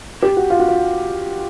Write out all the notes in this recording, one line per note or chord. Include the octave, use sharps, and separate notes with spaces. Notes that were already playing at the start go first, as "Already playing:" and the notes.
G4
F#4
F4
F#4
F4